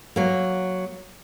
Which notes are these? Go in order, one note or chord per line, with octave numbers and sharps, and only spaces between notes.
F#3 A#3